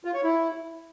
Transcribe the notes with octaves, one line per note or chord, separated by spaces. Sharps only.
F4
C#5
E4